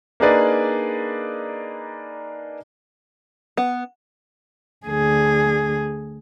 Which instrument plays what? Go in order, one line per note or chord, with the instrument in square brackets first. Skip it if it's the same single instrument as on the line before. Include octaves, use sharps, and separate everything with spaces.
[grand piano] A#3 D4 D#4 G#4 B4 D5
[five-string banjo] B3
[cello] D2 G#4